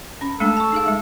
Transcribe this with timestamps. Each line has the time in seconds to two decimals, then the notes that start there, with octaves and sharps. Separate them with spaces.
0.21 C#4 B5
0.40 G#3 A3 D4 A4
0.57 A5 C#6
0.72 D#4 G#4 F5
0.86 G#3 E5